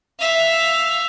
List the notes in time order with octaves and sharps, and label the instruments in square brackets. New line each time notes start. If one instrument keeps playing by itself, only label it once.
[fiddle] E5 F5